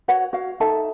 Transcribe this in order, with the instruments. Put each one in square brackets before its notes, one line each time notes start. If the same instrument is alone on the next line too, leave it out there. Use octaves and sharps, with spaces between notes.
[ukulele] F#4 B4 C#5 F#5
F#4 F5
D#4 A4 E5 A5